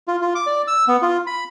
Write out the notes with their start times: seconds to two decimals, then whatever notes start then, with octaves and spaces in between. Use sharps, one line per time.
0.08 F4
0.21 F4
0.35 D6
0.47 D5
0.68 E6
0.88 B3
1.02 F4
1.27 B5